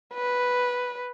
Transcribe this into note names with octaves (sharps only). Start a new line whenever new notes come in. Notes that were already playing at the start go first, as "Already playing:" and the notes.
B4